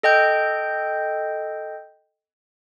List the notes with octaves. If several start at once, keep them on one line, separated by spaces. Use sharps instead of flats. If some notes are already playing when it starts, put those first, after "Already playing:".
A4 D#5 G5 G6